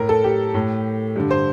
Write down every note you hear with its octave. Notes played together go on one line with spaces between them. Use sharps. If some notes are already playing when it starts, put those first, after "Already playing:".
Already playing: A2 A#4
A4
G4
A2
G2 D3
C5